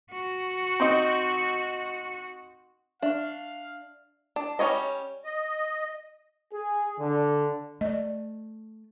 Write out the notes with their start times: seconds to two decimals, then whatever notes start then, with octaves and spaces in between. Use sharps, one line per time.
0.12 F#4
0.80 C4 D#4
3.02 D4 E5 F5 C#6
4.36 D4
4.59 G3 C#4 F4 C#5 D#5
5.25 D#5
6.53 G#4
6.99 D3
7.81 A3 D5 D#5